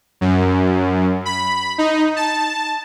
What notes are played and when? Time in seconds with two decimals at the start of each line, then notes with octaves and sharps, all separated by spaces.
0.21 F#2
1.25 B5
1.78 D#4
2.16 A5